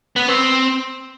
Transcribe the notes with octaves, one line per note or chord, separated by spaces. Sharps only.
B3
C4